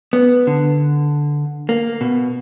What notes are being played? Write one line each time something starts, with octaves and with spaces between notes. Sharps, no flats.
B3
D3
A#3
B2